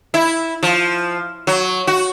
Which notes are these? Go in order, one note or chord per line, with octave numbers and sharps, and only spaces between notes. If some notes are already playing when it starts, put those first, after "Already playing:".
E4
F3
F#3
F#4